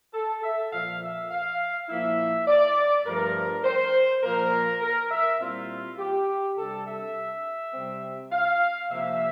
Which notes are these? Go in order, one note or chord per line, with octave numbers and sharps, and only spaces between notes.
A4
E5
A#2 F3 A#3 F5
E5
F5
A#2 F3 A#3 E4 E5
D5
G2 F3 A3 D4 A#4
C5
A#2 F3 A#3 A#4
A#4
E5
A#2 G3 C4 E4 F4
G4
C3 G3 D4 A4
E5
C3 G3 C4
F5
C3 F3 A#3 E5